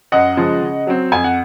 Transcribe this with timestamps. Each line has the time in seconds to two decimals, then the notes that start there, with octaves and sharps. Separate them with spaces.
0.12 F#2 D#5 F#5
0.37 C#3 F3 G#3
0.62 C#3
0.87 F#3 C4
1.12 F2 G#5
1.24 F#5